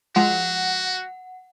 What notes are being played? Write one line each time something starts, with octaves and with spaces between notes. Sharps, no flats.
F3 G#3 F4 F#4 F#5